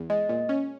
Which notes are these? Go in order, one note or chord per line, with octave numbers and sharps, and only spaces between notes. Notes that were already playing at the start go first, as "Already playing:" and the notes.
Already playing: E2
G#3 D#5
A#2
C#4